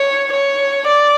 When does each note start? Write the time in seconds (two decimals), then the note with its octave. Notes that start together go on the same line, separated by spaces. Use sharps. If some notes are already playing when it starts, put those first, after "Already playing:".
Already playing: C#5
0.32 C#5
0.87 D5